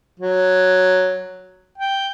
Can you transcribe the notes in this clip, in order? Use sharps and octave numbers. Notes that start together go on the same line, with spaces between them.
F#3
G5